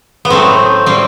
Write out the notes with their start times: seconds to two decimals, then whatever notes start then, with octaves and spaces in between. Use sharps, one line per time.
0.25 B3
0.30 A2 F#3 A3 C4
0.86 A2 G3 C4